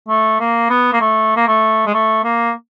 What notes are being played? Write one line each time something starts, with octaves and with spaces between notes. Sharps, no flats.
A3
A#3
B3
A#3
A3
A#3
A3
G#3
A3
A#3